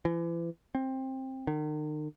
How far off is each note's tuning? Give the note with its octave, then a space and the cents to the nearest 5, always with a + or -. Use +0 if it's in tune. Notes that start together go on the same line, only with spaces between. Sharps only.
E3 +35
C4 +15
D#3 -40